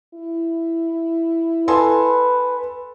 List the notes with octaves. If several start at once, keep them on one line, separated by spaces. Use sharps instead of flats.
E4
A4 B4 G#5 C6